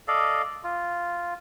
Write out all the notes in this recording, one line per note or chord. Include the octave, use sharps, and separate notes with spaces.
A4 D5 D#5 F5
F4